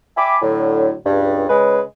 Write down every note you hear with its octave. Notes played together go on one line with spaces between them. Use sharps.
E5 G5 G#5 B5 D6
A2 D3 F#3
C#2 G2
C#3 G#3 B4